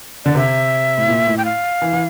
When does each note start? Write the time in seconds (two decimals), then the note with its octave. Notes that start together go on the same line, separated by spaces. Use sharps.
0.25 D3 D5
0.35 C3 E5
0.98 A2
1.08 A#2
1.27 A2
1.38 G5
1.45 F5
1.82 E3
1.93 E3